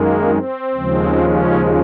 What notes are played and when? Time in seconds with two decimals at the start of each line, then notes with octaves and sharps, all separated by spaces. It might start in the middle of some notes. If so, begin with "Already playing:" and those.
Already playing: F#2 D#3 G#3 A#3
0.29 C4
0.74 D#2 C#3 F3 G#3
1.20 C#4